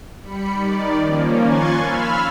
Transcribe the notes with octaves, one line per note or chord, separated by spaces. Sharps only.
G3 B5 C#7
D#3 D5
F3 A#3 C#4
G#5 C6 C#6 F#6 G#6 A6
F5 B5 E6 F6